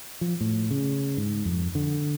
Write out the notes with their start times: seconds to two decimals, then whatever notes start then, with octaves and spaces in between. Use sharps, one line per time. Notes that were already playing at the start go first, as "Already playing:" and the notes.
0.21 F3
0.41 A2
0.71 C#3
1.17 G#2
1.45 F2
1.75 D3